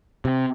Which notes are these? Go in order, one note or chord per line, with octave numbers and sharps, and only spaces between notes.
C3